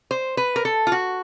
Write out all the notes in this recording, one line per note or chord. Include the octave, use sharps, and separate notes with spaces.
C5
B4
A#4
A4
F4
F#4